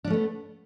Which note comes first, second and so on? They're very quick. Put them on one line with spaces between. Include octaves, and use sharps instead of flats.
D4 C#4 A3 B3